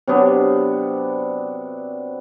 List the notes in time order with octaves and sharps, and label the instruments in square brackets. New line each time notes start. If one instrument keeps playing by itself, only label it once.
[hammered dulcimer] C3 F#3 B3 D4